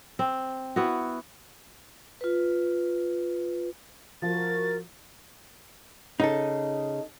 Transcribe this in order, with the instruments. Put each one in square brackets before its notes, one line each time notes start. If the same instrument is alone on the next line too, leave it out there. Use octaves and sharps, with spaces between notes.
[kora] C4
B3 E4 F#4
[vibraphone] F4 B4
[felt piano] F3 [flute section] F#4 A#4 [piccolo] A6
[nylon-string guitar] C#3 [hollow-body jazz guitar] D#4 A4